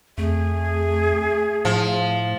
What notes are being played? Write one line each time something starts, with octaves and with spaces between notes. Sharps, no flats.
F2 A3 G#4
A2 F3